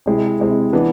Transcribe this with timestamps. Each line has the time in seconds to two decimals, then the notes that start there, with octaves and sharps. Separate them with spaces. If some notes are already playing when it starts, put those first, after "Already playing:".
0.06 C3 G#3 C4 E4
0.40 C3 G#3 C4 E4
0.73 E3 B3 D4